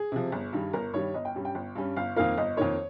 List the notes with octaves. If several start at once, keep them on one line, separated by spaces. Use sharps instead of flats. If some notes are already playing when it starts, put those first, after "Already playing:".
Already playing: G#4
C3 F3
G1
G2 D#3 G3
G1 A#4
G2 D#3 G3 C#5
G1 D#5
G5
G2 G3 C#4
G5
G1
G2 G3 C#4
G1 F5
F2 D#3 A#3 F5
G1 D#5
F2 D#3 A#3 C#5